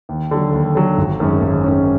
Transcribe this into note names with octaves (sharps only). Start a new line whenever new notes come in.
D#2
D3 F#3
D#2
D3 F#3
G#1
F#2 D#3 G#3 C#4
G#1
F#2 D#3 G#3 C#4